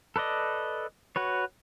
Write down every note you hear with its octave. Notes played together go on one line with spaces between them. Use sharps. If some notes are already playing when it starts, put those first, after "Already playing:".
A4 B4 D5 D#5
F#4 B4 C#5